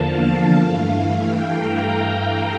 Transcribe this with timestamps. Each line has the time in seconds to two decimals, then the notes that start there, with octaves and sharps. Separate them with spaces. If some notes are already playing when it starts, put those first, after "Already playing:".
Already playing: E2 D3 F3 A#3 F5 A5
0.58 G2 E3 A3
1.24 G5
1.56 A#5